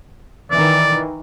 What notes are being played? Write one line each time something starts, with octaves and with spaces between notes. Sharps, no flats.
D#3 E3 D5